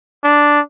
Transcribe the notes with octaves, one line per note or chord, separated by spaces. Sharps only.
D4